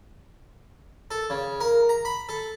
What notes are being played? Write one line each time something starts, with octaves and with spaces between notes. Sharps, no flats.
A4
C#3
A#4
A#5
B5
A4